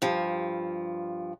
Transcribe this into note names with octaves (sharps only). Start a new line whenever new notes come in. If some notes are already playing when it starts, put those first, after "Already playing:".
G2 F3